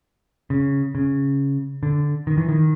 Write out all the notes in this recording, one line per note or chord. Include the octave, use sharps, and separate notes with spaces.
C#3
C#3
D3
D#3
E3
D#3